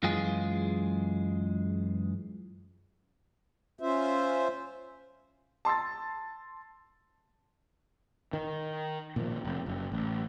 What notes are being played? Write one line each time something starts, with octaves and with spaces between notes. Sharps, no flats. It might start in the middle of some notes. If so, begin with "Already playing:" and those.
F#2 E3 G#3 F4 G#4
C#4 F4 C5 E5
A5 C6 E6 A6
D#3
A#2 D#3 F3
F1
F#1
A1